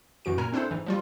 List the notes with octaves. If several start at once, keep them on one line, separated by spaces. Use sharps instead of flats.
F#2 E3 F#4 D7
A#2 A#4 G#5 A#5
C4 D4 E4 A4 C5
G#2 E3
F3 G3 F4